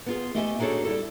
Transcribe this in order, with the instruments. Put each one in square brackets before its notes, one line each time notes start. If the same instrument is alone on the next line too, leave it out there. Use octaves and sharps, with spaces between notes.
[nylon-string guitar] B3 F4 G#4
A3 G4 D#5 E5 F#5 G#5
D4 D#4 F#4 G#4 A4 C#5
G3 E4 A4